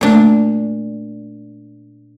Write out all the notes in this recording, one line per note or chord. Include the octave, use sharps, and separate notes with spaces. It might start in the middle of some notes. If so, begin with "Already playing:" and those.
A#2 A3 A#3 D4